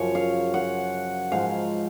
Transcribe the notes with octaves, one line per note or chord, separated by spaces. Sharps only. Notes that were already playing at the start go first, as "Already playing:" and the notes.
Already playing: F#2 C#3 F3 C#5
F5
F#5
G#2 F3 F5